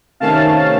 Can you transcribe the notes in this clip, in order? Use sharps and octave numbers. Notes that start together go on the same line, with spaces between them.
C3 D#3 A3 C#4 F5 A5